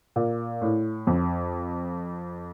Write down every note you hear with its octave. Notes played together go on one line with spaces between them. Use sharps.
A#2
A2
F2